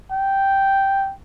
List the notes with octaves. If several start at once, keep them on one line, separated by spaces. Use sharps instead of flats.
G5